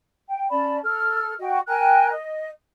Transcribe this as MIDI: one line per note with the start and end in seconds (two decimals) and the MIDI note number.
0.27 0.50 79
0.50 0.79 61
0.50 0.79 74
0.50 0.79 81
0.50 0.79 83
0.83 1.34 69
0.83 1.34 89
1.40 1.59 66
1.40 1.59 75
1.40 1.59 79
1.67 2.10 70
1.67 2.10 79
1.67 2.10 80
1.67 2.10 90
2.11 2.49 75